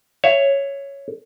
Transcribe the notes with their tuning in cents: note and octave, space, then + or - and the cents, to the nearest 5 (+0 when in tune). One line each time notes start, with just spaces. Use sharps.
C#5 +0 E5 +25